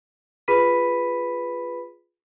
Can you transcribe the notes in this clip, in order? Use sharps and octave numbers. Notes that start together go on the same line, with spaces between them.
F4 G#4 B4 B5 B6 D#7